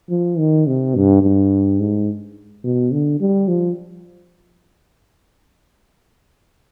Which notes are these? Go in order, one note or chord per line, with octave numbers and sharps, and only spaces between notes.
F3
D#3
C3
G2
G2
G#2
B2
D3
G3
F3